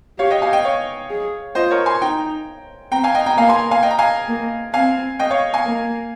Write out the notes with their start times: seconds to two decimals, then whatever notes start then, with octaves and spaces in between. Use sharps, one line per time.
0.19 G4 C#5 F5
0.31 D#5 G5
0.42 F5 G#5
0.53 D#5 G5
0.64 C#5 F5
1.10 G#4
1.55 F4 C5 D#5
1.71 A#4 C#5
1.86 G#5 C6
2.01 D#4 G5 A#5
2.92 C4 G5 A#5
3.03 F5 G#5
3.15 D#5 G5
3.26 G5 A#5
3.37 A#3 F5 G#5
3.49 G#5 C6
3.71 F5 G#5
3.83 D#5 G5
3.91 A#5
3.99 F5 G#5
4.28 A#3
4.74 C4 F5 G#5
5.19 D#5 G5
5.31 C#5 F5
5.54 F5 G#5
5.65 A#3